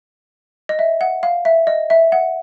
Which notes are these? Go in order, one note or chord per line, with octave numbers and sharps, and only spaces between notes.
D#5
E5
F#5
F5
E5
D#5
E5
F#5